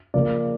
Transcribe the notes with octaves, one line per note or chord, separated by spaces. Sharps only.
C#3 F3 A#3 D5